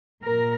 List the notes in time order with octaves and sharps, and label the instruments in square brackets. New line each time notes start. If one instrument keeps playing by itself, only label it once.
[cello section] A#2 A#4